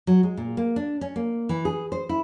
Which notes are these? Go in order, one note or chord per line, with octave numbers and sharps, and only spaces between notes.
F#3
G#3
A#2
A#3
D4
C#4
A#3
E3
G#4
C5
E4